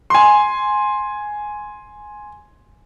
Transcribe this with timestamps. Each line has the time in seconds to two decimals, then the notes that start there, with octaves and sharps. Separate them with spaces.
0.10 G#5 C6